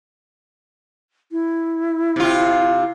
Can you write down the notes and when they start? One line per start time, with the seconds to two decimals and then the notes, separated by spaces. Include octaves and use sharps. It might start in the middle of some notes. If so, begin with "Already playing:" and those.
1.32 E4
2.16 C3 F4